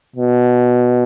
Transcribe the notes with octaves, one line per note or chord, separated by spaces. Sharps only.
B2